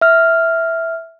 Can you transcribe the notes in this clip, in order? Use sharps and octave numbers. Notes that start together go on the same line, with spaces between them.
E5 F6